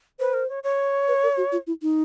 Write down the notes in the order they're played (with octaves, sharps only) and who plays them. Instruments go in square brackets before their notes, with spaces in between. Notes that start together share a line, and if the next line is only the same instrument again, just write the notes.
[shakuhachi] B4 [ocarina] C5
[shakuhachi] A#4
C#5
C#5
[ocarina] B4
A#4
F#4
F4
E4
D#4